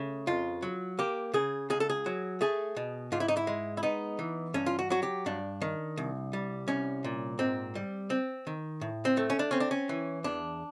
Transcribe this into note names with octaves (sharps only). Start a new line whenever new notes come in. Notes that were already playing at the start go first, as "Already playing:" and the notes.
Already playing: C#3 A3
F2 F4
F#3
A#3 G4
C#3 G#4
C#2 G#4
A4
G#4
F#3
A3 G#4
B2
G#2 F4
E4
D#4
E4
G#3
E4
B3 D#4
E3
G2 C#4
F4
F#4
F#3 F#4
G4
G2 D4
D#3
C2
G3
C2 C#4
A#2
G#2 C4
G3
C4
D#3
A2
C4
A3
C#4
D4
C4 C#4
D4
C#4
E3
E2 D4